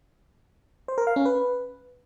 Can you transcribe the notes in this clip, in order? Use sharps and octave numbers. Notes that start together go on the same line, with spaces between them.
C5
A#4
F5
C#4
B4